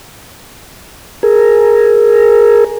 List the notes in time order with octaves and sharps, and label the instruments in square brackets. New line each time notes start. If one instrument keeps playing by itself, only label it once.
[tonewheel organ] G#4 A#4